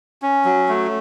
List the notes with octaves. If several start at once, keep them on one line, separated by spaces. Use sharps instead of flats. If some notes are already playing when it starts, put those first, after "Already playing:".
C#4
F#3
A3